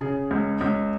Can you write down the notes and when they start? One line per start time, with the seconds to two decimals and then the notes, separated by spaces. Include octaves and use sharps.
0.01 C#3 G#4
0.31 C#2
0.61 C#2